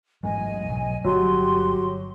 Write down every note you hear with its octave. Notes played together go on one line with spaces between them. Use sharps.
A1 G#2 F#3 D#5 G#5
B1 F#3
G1 F#3 F#4 G4 C6